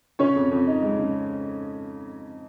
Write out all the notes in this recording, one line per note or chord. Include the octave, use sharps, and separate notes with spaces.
C#3 C#4 C#5
F2
F2
D#4
G#3
C#3